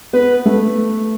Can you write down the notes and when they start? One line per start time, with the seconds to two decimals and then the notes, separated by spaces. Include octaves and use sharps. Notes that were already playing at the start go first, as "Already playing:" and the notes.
0.13 B3 B4
0.46 A3